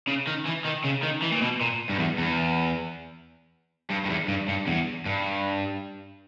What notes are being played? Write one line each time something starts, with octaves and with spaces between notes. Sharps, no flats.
C#3
D#3
E3
D#3
C#3
D#3
E3
A#2
B2
A#2
G2
E2
E2
G2
G2
E2
G2
G2
E2
G2